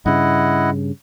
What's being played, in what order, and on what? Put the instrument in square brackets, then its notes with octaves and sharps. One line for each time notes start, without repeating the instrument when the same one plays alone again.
[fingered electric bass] G2 C#3 [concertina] E4 D#5 F#5